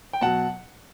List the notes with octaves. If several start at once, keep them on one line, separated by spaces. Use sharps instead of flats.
G5
B2 F#3 F#5 A5